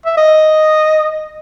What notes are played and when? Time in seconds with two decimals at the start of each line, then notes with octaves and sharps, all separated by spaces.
0.06 E5
0.17 D#5